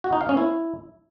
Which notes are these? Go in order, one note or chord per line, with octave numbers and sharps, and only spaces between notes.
F#4
D#4
F5
C#4
E4